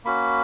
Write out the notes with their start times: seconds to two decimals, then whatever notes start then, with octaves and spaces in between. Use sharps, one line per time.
0.05 A#3 C#4 F#4 B5